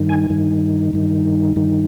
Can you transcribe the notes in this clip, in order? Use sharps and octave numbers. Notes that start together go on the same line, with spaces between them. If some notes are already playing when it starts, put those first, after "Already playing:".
Already playing: G2 D#3
G#5
G2 D#3
G2 D#3
G2 D#3